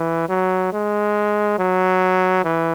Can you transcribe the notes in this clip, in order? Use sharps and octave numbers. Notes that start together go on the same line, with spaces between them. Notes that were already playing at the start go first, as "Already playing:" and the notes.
Already playing: E3
F#3
G#3
F#3
E3